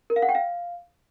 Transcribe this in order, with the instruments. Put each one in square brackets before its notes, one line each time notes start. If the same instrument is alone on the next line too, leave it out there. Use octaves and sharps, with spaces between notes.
[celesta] A#4
F5
F#5
G5
F5